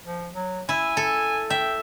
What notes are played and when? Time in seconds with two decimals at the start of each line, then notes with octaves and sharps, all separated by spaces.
0.06 F3
0.33 F#3
0.69 E4 G#5
0.97 A4
1.50 E5 G5